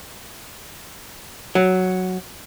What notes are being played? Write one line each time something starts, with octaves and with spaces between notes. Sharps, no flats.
F#3